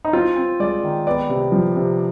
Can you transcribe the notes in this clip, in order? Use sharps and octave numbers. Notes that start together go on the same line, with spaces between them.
D#4
C4 F4
C4
G#3 D5
D#3
B3 D5
C3
F3
C3